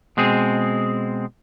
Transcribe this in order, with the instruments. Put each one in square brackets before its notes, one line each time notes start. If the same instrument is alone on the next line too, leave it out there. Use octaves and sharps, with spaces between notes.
[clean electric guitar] B2 G#3 C4 G#4